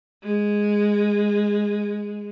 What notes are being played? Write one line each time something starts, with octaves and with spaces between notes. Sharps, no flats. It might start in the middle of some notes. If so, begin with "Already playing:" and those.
G#3